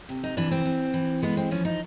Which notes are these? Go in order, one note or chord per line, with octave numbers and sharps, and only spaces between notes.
C3
D#4
E3 D4
C4
E3
E3
G#3 B3
C4
F3 C#4
D#4